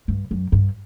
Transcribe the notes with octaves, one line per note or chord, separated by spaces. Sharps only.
G2
F#2
G2